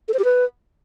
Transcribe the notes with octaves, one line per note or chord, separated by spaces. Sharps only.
A4
C5
G4
B4